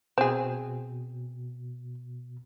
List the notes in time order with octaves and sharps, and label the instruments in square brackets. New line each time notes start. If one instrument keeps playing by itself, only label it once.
[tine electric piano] B2 [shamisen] C4 G#4